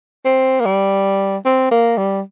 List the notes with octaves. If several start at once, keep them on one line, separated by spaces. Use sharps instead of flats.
C4
A#3
G3
C4
A#3
G3